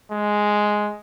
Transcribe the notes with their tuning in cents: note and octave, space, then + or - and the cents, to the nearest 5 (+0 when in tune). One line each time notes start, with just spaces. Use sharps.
G#3 +5